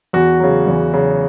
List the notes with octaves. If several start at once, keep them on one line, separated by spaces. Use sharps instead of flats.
E2 F#4
C#3 F#3
E2
C#3 F#3